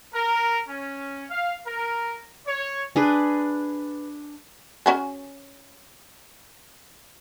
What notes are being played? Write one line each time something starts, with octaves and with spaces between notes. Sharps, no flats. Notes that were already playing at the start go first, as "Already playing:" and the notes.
A#4
C#4
F5
A#4
C#5
D4 G#4 B4
C#4 F#4 G#4